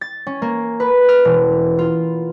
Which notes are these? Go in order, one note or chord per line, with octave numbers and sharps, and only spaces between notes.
A6
C#4
A#3
B4
F6
E1
F4